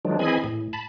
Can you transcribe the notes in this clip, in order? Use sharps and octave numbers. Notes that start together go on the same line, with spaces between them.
D#3 F3 F#3 G#3 D4
E3 C4 G#4 D#5 G#5 B5
A2
A5 B5